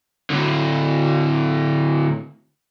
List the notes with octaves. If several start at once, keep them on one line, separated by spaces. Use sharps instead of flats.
A2 D3